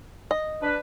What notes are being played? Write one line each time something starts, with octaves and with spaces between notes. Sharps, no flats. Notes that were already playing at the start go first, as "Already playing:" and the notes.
D#5
D4 B4